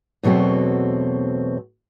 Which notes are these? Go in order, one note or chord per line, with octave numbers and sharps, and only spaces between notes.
E2 B2 F#3 A3 C4